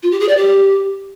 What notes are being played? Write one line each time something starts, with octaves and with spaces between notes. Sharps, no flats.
F4
G4
G#4
D5
G4